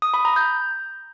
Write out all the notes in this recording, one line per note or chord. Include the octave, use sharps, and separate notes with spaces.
D#6
B5
A#5
G6